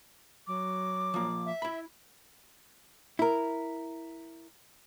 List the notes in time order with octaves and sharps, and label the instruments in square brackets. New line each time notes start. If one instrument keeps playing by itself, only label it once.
[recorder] F#3 [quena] D6
[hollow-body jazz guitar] F3 A#3
[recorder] E5
[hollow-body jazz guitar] E4 B5
E4 A#4